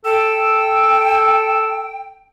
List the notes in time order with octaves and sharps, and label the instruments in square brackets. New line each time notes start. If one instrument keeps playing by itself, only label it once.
[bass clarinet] A4 [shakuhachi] G5 [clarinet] E6